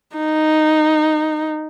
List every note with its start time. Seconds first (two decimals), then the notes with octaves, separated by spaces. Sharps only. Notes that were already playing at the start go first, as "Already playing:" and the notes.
0.16 D#4